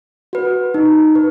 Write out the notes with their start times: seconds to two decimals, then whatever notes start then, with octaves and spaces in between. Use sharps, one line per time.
0.33 F#4 B4
0.74 D#4
1.15 B4